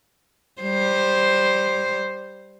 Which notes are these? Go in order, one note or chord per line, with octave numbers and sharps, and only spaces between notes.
G3 C5